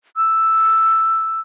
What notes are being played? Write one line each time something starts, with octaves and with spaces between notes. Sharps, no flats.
E6